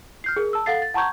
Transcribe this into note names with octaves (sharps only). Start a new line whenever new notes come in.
F6 G6 C7
G#4 A#4
A5 E6
A4 F5 F#5 A6 C7
A6
F#5 A5 A#5 C#6 G6 G#6